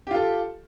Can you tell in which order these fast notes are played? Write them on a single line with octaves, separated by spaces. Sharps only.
G4 F4 A4